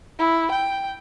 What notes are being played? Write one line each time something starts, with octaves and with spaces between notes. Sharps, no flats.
E4
G5